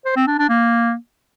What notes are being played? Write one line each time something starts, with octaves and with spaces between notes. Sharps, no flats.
C5
C4
D4
D4
A#3